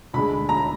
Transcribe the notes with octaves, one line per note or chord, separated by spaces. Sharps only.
D2 D3 G#3 B5
A#5